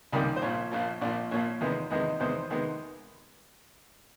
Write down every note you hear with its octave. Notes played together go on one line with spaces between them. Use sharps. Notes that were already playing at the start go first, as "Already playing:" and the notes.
C#2 C3 D#3 G3 A#3
C5
A#1 A#2 F3 C#5
A#1 A#2 F3
A#1 A#2 F3 D5
A#1 A#2 F3 C#5
E2 C3 D#3 G#3 B3
E2 C3 D#3 G#3 B3 D#5
E2 C3 D#3 G#3 B3 C5
C3 D#3 G#3 B3